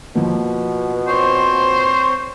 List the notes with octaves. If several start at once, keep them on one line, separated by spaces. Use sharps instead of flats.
B2 F3 A#3
C4 C5 C#5